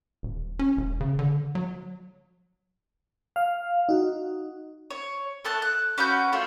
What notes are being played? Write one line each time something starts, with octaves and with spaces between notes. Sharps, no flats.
D#1
C#4
E1
C#3
D3
F#3
F5
D#4 F#4
C#5
A3 A5 F#6
F#6
C#4 F#4 B4 G6
A3 F4 A4